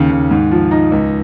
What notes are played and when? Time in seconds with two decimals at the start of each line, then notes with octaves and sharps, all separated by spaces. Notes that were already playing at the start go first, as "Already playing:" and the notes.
Already playing: D#2 C#3 C#4
0.11 D#2
0.31 G#2
0.51 F3
0.71 D#4
0.92 C#2